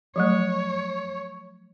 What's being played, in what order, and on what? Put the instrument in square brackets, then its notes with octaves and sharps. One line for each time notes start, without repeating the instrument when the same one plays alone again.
[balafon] F3 F#3 A3 [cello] C#5